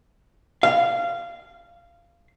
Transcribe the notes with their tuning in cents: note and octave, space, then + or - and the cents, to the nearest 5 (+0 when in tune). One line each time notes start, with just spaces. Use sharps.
F5 -20